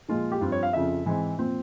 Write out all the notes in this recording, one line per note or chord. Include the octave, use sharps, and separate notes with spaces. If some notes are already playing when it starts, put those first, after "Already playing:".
A#2 F3 G#3 F4
G4
G2 F3 C4 F4
C#5
F5
F2 C#3 F3 E5
G#2 E3 G#3 C4
A#2 F3 C4